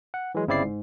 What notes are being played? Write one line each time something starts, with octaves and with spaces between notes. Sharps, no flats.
F#5
E3 F#3 G#3
G1 C#3 C4 E4 D5 C7
G#2